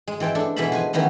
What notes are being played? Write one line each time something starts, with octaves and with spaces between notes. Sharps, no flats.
G#3
E3 C4 G5 A5
D4 A4
B2 E3 G#3 E5 A5 B5
F3 B4 G#5
D#3 E3 F#3 B3 C#4